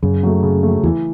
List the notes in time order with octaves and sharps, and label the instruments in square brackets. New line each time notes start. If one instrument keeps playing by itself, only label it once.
[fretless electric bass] F#2 [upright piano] C#3
[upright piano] F#3 A3
C#3
F#3 A3
[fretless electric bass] E2 [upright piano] E3